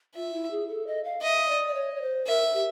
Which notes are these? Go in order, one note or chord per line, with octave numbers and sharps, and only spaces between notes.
F4 E5
E4
G#4
A4
D#5
F5
D#5 E5
D5
D5
C#5
C#5
C5
A#4 E5
G4